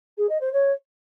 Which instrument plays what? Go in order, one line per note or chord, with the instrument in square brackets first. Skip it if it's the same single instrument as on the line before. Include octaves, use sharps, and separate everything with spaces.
[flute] G#4
D#5
C5
C#5